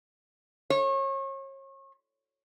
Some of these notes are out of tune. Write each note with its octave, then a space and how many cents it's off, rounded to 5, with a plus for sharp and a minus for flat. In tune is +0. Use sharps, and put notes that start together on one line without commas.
C#5 -35